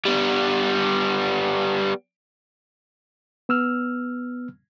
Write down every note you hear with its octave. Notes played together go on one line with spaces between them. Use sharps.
G3 B3
B3 E6 F6